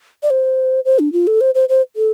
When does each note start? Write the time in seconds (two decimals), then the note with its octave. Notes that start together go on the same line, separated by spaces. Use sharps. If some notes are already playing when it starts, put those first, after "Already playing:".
0.23 D5
0.30 C5
0.85 C5
0.99 D4
1.13 F4
1.27 A4
1.41 C5
1.55 C5
1.69 C5
1.96 A4